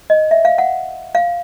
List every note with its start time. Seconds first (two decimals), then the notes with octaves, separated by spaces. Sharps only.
0.10 D#5
0.31 E5
0.45 F5
0.58 F#5
1.15 F5